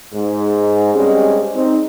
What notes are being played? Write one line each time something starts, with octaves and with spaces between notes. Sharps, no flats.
G#2
G2 G3 G#3 C4 C#4 G4
C4 D#4